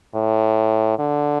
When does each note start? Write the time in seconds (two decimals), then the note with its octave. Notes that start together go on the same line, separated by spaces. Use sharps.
0.14 A2
0.99 D3